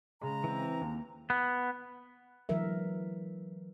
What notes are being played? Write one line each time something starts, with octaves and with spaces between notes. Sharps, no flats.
C#3 G#3 A#5
E3 C4
D#2
B3
D3 E3 F#3 G#3 A#4 E5